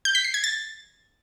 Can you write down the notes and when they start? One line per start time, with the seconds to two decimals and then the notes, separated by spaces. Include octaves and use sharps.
0.05 G6
0.15 B6
0.24 C7
0.34 G#6
0.44 A6